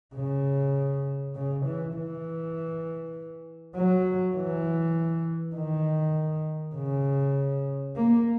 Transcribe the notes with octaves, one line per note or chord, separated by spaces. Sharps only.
C#3
C#3
E3
E3
F#3
E3
D#3
C#3
A#3